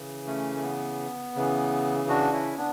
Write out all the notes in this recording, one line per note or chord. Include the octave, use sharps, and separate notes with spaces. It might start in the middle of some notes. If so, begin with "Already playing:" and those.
Already playing: C#3 E3
A3 C#4
A3
B3
C#3 E3
D4 F#4
C#4 E4
B3 D4